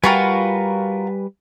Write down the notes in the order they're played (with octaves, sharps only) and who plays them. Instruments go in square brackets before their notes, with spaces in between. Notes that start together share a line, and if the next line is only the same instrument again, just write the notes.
[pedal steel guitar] G3 B4 G#5 [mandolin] F4 F#4 A#4